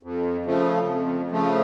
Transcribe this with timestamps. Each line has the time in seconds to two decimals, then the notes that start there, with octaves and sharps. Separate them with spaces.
0.03 F2
0.45 C#3 F3 A3
0.87 F2
1.30 C#3 F3 A3